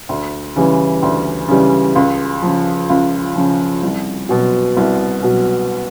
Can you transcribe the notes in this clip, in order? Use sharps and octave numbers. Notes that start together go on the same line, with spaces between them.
D2
C#3 E3 G3
D2
C#3 E3 G3
C#2
C#3 F3
C#2
C#3 F3
C2
B2 F#3
C2
B2 F#3